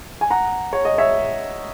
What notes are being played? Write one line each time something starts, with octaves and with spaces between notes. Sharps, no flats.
G#5
F#5 A#5
C#5
D#5
C#5 E5